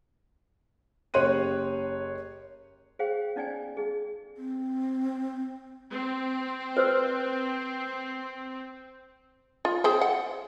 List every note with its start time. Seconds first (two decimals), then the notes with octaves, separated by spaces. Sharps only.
1.14 F#1 G4 C#5 C6 F#6 D#7
2.99 G#4 C5 F5 G5
3.36 C#4 D#4 D5 G5 G#5
3.77 D#4 G#4
4.37 C4
5.92 C4
6.77 B4 C5 E6
9.65 F4
9.84 C4 G#4 C5
10.01 F#5